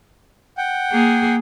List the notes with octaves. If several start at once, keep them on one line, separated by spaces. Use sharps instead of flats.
F#5 G5
A#3 G#4